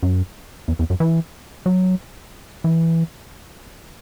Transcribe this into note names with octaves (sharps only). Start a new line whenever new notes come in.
F#2
E2
E2
F#2
E3
F#3
E3